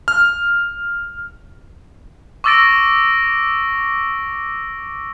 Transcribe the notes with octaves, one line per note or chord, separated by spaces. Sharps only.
F6
C#6 D6 E6 A6 A#6 D7